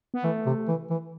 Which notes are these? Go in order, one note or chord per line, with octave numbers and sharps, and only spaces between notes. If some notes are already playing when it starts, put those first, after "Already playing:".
B3
E3 A3
C3
E3
E3